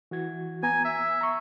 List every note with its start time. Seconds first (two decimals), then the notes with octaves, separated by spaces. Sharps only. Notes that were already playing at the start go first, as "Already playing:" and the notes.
0.11 E3 F#4 G#6
0.63 B3 G#5 A#5
0.85 E5
1.21 A#5 C#6